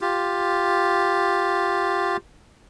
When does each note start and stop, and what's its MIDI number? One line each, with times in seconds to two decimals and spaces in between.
0.01 2.17 65
0.01 2.17 67